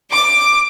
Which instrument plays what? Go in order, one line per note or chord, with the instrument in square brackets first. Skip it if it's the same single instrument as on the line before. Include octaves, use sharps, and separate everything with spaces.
[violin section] D6